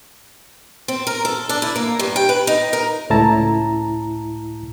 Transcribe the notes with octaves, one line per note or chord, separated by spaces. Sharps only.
C4
A#4
A4
D4
E4
A#3
G2
G5
B4
D#4
A#4
C#2 A2 E4 A5 A#5